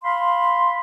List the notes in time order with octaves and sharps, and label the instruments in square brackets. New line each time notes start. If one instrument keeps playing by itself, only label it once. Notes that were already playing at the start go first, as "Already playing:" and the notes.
[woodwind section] F5 B5 C6